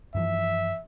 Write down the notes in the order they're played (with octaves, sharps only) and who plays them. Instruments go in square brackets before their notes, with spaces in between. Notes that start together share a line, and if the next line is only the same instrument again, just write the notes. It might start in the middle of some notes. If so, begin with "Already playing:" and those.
[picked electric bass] G2 E3 F3 [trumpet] E5